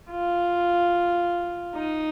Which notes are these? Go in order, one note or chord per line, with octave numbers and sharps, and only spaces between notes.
F4
D#4